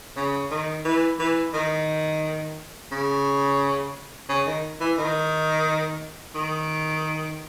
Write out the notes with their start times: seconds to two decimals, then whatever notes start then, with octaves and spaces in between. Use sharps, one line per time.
0.17 C#3
0.51 D#3
0.85 E3
1.19 E3
1.54 D#3
2.92 C#3
4.29 C#3
4.47 D#3
4.80 E3
4.98 D#3
6.35 D#3